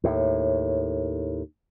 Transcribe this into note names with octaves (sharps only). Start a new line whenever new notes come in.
D#2 A2